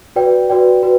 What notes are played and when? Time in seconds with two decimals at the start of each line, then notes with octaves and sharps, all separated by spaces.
0.16 F#4 B4 D5 G5
0.50 F#4 B4 D5 G5
0.83 F#4 B4